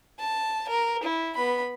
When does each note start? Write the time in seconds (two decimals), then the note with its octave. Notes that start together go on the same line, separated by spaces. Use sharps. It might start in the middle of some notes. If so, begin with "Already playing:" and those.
0.19 A5
0.68 A#4
1.03 E4
1.35 B3 B5